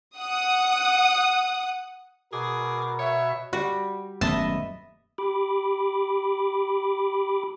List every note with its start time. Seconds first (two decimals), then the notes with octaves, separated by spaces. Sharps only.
0.17 F#5 D#6
2.33 B2 G#4 A#4 D6
2.99 C#5 E5
3.53 G3 F#4
4.21 D#1 F#2 A3 B3 D#5 E5 A5
5.18 G4 B5 D6